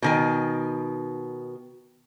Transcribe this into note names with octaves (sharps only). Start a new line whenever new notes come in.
B2 D#3 G#5